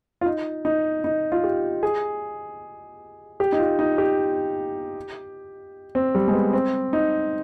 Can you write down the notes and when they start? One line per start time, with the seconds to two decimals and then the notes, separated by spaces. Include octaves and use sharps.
0.21 F4
0.26 D#4
0.65 D#4
1.04 D#4
1.32 F4
1.44 G4
1.83 G#4
3.40 G4
3.52 D#4
3.59 F4
3.79 D#4
3.98 G4
5.95 C4
6.15 G3
6.28 G#3
6.33 B3
6.53 C4
6.93 D#4